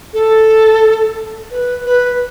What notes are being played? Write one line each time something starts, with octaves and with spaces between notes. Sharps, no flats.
A4
B4
B4